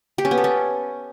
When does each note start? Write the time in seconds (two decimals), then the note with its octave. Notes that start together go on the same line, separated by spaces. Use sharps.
0.18 G4
0.25 C#4
0.31 B3
0.38 A4
0.44 C#4